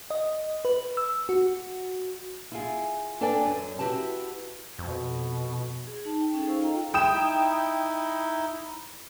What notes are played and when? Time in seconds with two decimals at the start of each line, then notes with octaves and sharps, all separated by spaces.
0.11 D#5
0.65 B4
0.97 E6
1.29 F#4
2.52 E4 F4 G#4
3.21 D4 A4 B4 D5 G5 G#5
3.45 F#2
3.79 E4 F#4 G4 B4 A5
4.78 F2 B2
5.87 G#4
6.05 D#4 A5
6.21 G5
6.34 C#4 D#4 G#4 A4
6.47 D#4 A4 C5 F5 C#6 E6
6.61 F4 D#5 F5 G5 A#5
6.94 E4 G5 D#6 E7
7.14 D#4 E4